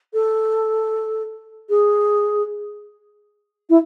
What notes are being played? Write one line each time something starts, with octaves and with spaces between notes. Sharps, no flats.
A4
G#4
E4